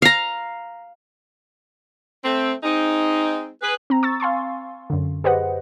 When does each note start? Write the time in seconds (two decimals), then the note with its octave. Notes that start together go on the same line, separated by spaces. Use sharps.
0.02 F5 A#5
2.24 A3 C4
2.63 G#3 C4 D#4
3.62 G#4 B4
3.90 C4 A#5
4.03 C#6 E6 A6
4.20 F5 G#5 C6 C#6
4.90 F#2 D3
5.24 G4 G#4 B4 C5 D#5 F#5